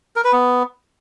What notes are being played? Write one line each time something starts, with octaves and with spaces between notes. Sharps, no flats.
A#4
B4
B3